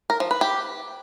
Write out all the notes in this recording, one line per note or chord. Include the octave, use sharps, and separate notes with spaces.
A#4
F3
B4
G4